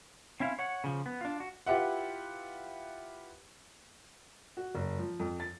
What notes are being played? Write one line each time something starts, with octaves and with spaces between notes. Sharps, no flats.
C4 C#4 E4 E5 F5
C#5 F#5
C#3 F3
B3
D4 F4
F#4
E4 F4 G4 B4 E5 F#5
F#4
F#1
F3
F2
A6